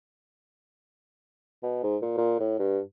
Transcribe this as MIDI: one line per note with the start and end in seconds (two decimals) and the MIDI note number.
1.63 1.82 47
1.83 1.97 44
2.02 2.17 46
2.18 2.36 46
2.40 2.58 45
2.59 2.80 43